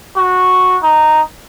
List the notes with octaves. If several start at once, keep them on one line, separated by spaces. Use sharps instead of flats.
F#4
D#4